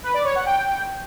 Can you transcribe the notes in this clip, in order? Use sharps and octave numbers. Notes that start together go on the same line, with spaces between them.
B4
D5
C#5
F#5
G5